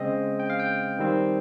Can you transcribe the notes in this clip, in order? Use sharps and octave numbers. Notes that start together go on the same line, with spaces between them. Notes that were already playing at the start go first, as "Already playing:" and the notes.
Already playing: C#3 G#3 C4 D#5
G5
F5
G5
D#3 G3 C4